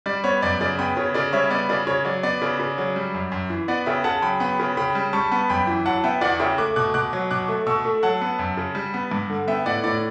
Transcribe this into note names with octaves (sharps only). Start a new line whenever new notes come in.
G3 D5
B3 C#5
F#2 D5
C#3 D5
B3 G5 B5
C#3 C#5
C#3 D5
G3 C#5 E5
B3 D5
C#3 D5
C#3 C#5
F#3 D5
B3 D5
C#3
C#3
F#3
G3
F#2
F#2
E3
B3 D5 F#5
C#3 E5 G5
C#3 F#5 A5
F#3 G5 B5
B3 G5 B5
C#3
C#3 G5 B5
G3
G3 A5 C#6
B3
F#2 G5 B5
E3
F#3 F#5 A5
B3 E5 G5
E2 D5 F#5
C#3 E5 G5
A3 D6 F#6
B2 D6 F#6
B2 D6 F#6
F#3
B2 D6 F#6
A3
B2 C#6 E6
A3
F#3 F#5 A5
B3
F#2
C#3
G3
B3
G2
D3
B3 E5 G5
A2 D5 F#5
A2 D5